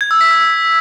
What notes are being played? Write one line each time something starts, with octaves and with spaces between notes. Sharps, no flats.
G#6
E6
B6
E6